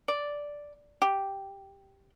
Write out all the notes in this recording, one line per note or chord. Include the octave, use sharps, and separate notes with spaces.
D5
G4